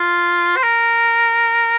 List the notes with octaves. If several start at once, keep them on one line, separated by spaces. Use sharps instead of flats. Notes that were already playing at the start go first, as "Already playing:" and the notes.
Already playing: F4
C5
A#4